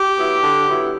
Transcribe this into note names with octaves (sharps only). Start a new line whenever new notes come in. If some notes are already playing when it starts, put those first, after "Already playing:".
Already playing: G4
F#3 B3 E4
D3
F#3 B3 E4